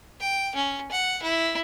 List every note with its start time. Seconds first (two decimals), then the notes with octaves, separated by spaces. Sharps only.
0.20 G5
0.55 C#4
0.91 F#5
1.23 E4